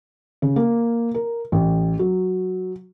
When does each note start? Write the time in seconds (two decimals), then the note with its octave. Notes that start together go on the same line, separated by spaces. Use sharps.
0.42 C#3
0.56 A#3
1.14 A#4
1.52 A1
1.99 F#3